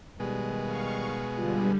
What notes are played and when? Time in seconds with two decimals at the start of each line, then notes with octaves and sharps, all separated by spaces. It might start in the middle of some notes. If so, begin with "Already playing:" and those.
0.20 B2 D#3 G3 G#3
0.62 F5 C#6
1.37 G2 D3 G3 F4 G4